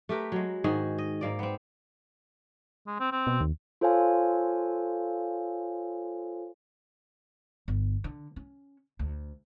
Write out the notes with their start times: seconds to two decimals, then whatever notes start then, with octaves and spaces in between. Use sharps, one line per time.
0.09 A3 G4 A#4 B4
0.32 F#3 G#3
0.64 G#2 D#3 F#4 G#4
0.98 D#5
1.21 G#2 A#3 D5
1.39 B3 C4
2.87 G#3
3.00 C4
3.12 C4
3.27 B2
3.41 D#2
3.81 F4 A4 C5 C#5 F5 G#5
7.68 G1
8.04 D3
8.36 C#4
8.99 D2